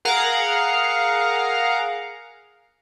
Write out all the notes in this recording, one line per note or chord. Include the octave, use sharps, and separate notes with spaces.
G#4 A#4 F5 F#5 A#5